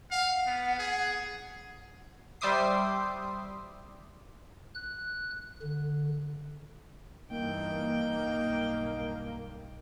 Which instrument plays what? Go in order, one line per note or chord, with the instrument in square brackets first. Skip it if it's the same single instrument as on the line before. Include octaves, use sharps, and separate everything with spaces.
[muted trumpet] F5 [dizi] F#5
[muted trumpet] B3
G#4
[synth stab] G3 C5 E5 D6 D#6 C7
[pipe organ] F#6
D3
[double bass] G2 E3 [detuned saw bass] A#3 [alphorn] D#4 [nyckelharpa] G5
[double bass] B1 G2